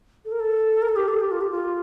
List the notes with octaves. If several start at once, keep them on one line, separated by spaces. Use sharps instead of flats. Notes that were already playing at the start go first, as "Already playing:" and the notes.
A4
A#4
A4
A#4
A4
G4
A4
G4
F4
G4
F4